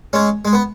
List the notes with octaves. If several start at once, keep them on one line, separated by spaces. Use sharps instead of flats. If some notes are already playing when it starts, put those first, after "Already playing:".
G#3 C#4
G#3
B3